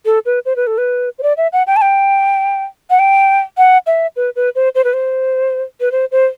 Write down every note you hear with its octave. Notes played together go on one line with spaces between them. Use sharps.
A4
B4
C5
B4
A4
B4
C5
D5
E5
F#5
G5
A5
G5
F#5
G5
F#5
E5
B4
B4
C5
C5
B4
C5
B4
C5
C5